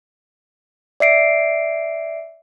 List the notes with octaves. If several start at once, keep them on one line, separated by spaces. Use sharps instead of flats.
D5 E5 C7 D7